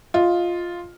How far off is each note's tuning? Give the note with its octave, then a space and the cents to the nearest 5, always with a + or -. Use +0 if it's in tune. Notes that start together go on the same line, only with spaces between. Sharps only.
F4 +0 D#5 +15